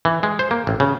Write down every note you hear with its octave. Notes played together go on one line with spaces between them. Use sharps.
E3
G#3
C5
A#3
A1
C#3